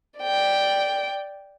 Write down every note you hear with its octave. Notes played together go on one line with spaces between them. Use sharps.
D5 G5